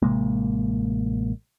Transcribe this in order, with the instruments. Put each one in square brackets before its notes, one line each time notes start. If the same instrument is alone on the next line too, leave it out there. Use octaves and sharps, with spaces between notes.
[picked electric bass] A1 C3 G#3 A#3